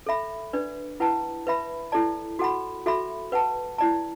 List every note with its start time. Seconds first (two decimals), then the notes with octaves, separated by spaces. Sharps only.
0.06 A4 E5 B5
0.53 D4 B4 D5
1.00 E4 B4 F#5 A5
1.47 B4 E5 B5
1.92 E4 A4 D5 A5
2.39 F#4 A4 F#5 B5
2.86 F#4 A4 E5 B5
3.32 B4 F#5 A5
3.78 E4 D5 A5